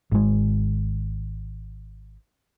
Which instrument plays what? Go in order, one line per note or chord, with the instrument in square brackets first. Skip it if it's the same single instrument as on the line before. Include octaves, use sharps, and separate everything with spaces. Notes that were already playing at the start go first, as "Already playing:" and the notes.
[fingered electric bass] G#1 G#3